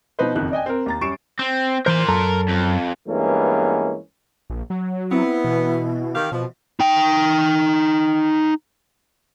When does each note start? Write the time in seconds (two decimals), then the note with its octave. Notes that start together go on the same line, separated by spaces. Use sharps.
0.19 B2 F3 D#4 B4 C5
0.35 F#1 F2 D#3 F#6
0.52 D5 D#5 G5 G#5
0.66 C4 A#4
0.86 D#2 A#5 A6
1.01 F#2 G3 C#6 C7 D7 E7
1.39 C4
1.86 E3 A#4 C5 C6
2.08 F#2 A4 A#5
2.49 F2
3.08 G2 E3 G#3 A#3 B3 C#4
4.50 A#1
4.70 F#3
5.11 B3 C4 E4
5.45 B2 E3
6.15 D#3 G4 F5
6.32 B2 F3
6.80 D#4 G5